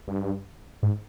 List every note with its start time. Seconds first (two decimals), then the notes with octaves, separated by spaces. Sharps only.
0.08 G2
0.83 G#2